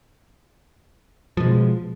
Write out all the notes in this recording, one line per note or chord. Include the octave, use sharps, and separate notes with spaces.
B2 F3 G#3